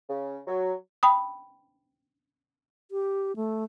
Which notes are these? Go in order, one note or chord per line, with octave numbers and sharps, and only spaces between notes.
C#3
F#3
G5 B5 D#6
G4
A3